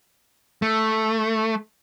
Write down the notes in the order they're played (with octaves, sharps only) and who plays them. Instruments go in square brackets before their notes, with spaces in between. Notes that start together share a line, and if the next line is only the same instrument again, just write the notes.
[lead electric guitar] A3